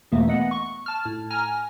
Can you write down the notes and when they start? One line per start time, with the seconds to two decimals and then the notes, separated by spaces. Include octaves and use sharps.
0.12 E2 B2 E3 A3 A#3
0.28 B3 D#5 F#5
0.51 C#6
0.86 A5 F6
1.05 A2
1.30 G#5 A#5 F6